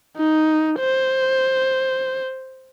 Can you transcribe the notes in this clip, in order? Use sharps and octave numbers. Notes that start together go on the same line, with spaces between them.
D#4
C5